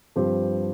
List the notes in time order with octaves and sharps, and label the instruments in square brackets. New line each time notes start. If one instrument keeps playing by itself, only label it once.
[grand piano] G2 F3 C4 G4 C5